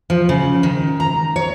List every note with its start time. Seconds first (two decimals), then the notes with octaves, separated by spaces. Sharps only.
0.10 F3
0.29 C#3
0.63 D#3
1.00 A#5
1.36 C#5